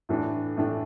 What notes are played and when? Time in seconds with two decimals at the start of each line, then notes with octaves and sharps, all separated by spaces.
0.09 A2 E3 A3 D4
0.57 A2 E3 A3 D4